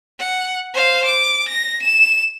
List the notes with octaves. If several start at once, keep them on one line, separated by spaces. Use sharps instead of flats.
F#5
C5 F5
D6
A#6
E7